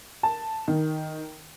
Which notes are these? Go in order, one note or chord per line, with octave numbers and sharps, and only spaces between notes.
A5
D#3